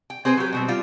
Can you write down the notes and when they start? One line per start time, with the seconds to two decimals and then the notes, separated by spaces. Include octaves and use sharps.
0.10 G5
0.25 C4 G#4 B4 C5
0.37 F#3 G4
0.53 B2 G3 C4
0.68 G3 F4